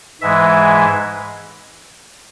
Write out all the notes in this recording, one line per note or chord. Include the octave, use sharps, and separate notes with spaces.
G#2 E3 G#3 E5